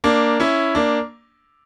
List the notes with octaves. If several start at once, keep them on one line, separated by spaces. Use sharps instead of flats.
A#3 D4
C#4 E4
A#3 D4